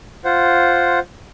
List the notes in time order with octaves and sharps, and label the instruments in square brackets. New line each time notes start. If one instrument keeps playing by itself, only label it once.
[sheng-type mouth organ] F4 C5 F#5